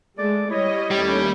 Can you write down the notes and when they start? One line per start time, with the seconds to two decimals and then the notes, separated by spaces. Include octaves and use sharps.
0.18 G#3 A3 D5
0.50 G3 E4 C#5 D#5
0.91 D#2 G3 A3 C#4